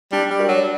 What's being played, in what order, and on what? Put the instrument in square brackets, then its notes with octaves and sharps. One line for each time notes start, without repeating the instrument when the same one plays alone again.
[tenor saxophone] G3 [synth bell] D4
[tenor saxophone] G3
[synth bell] F#4 A#4 D5
[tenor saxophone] F#3